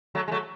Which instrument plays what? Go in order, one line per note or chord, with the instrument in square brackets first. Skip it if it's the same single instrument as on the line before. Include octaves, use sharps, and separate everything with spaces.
[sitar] F#3 A3
G#3
F#3 A3